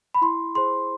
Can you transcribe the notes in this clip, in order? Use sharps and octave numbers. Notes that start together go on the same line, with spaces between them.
B5
E4 C6
G#4 C5 C6